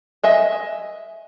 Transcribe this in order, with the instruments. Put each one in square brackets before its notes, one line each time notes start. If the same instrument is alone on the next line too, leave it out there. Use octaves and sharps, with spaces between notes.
[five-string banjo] D#5 E5 G#5